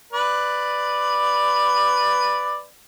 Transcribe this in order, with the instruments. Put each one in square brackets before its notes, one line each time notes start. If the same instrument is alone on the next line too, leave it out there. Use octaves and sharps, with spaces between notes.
[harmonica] B4 D5